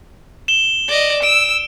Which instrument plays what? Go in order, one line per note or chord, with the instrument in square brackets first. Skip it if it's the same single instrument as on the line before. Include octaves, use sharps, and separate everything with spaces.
[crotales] E7 G7
[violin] D5 D#5
[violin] E6 [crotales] D7